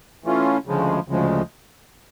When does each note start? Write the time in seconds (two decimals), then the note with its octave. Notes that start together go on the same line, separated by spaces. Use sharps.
0.24 E3 A3 C#4 F4
0.65 D2 C#3 F3 G#3
1.08 D2 C#3 F3 G#3